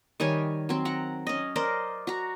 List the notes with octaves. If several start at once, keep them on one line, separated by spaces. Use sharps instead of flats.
D#3 G3 C#5 G#5
F#3 C4
F#5 A#5
C#4 D#5
A#4 C5 D5 D#5
F#4 A#5